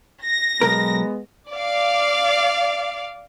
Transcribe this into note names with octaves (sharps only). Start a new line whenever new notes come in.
A#6
B1 G#3 B3 A#4
D5 F5